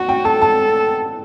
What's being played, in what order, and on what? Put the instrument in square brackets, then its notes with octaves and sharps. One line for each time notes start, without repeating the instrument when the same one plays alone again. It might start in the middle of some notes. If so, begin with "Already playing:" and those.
Already playing: [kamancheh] F#4 [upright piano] F#5
[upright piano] G5
[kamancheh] A4 [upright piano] A5
[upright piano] A5